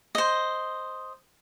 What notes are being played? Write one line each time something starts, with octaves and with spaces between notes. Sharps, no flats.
C5 D#5